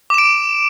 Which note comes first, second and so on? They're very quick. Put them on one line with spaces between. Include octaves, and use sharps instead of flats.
D6 E7 D7